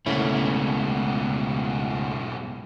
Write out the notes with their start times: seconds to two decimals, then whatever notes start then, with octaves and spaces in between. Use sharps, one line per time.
0.06 C#2 G#2 B2 A3 A#3 C#4 E4